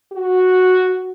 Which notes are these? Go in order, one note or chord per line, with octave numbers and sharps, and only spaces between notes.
F#4